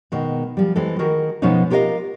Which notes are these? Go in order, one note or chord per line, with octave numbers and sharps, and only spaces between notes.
B2 D#3 G#3
F3 G3
E3 G#3 C4 A4
D#3 F#4 G#4 A#4
B2 F3 G#3 B3 C#4 D#4
F4 G4 A#4 C5 D#5 F5